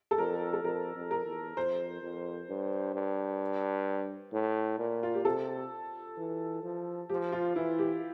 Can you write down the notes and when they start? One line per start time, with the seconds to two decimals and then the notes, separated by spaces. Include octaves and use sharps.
0.11 A4
0.18 F2 A#4
0.53 A4
0.64 F2 A#4
0.96 F2
1.11 A#4
1.26 E2
1.57 F2 C5
2.02 F2
2.49 G2
2.95 G2
4.33 A2
4.79 A#2
5.03 F4
5.14 G4
5.25 C3 A4
6.17 E3
6.63 F3
7.10 F3 G4
7.32 F4
7.56 E3 E4
7.79 G4